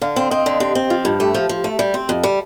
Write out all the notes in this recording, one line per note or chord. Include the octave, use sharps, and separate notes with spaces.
D3 F5
C4
C4 D#5
D3
C4 G4
C4
F3 F4
G2
A3 G4
F3
F3
A3
G3
C4
F2
G3